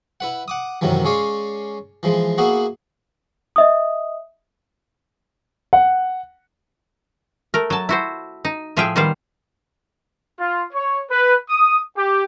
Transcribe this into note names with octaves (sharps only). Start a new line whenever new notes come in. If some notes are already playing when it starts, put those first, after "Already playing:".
E4 B4 F#5
F#5 D6 D#6
F#2 A2 C3 D#3 E3 F#3
G#3 C#4 C#5 D5 F5
E3 F3 G#3
A#3 B3 E4 F#4 G#4
D#5 E5 D#6
F#5
A3 A#4
F#3 A5
E4 F#4 C5
D#4
A2 F3 G#4 E5 F5 G5
D#3 G3 B3 C5 F5
F4
C#5
B4
D#6
G4